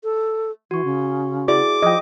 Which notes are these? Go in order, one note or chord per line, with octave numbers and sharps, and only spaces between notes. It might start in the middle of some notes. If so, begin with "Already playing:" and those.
A4
E3 F#4 C#6
C#3
E4 F#4 G#4 D5 D6
F3 D#5 G5